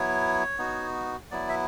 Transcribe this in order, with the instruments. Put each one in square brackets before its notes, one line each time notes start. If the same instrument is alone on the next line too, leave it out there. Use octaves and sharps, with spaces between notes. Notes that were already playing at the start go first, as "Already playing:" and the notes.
Already playing: [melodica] F#3 B3 E4 C#5
B3 D#4 F#4
F#3 B3 E4 D5
E5